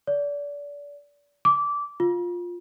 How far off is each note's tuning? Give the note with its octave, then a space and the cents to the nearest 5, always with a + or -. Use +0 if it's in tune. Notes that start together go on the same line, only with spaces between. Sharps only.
D5 -30
D6 -15
F4 +10